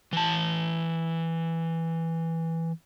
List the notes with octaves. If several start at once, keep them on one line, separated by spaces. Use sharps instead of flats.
E3 A5